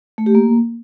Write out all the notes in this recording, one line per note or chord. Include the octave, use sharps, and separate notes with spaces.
A3
G4
A#3